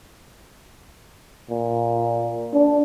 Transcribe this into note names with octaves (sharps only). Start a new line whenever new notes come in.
A#2
D4